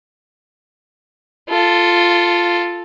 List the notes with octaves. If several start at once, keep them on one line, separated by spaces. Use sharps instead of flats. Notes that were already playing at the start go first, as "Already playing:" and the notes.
F4 A4